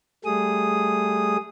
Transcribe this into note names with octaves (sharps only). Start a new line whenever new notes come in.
G3 A3 G#4 D#6